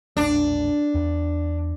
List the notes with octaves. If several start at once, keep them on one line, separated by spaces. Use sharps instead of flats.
E1 A#1 A3 D4
E2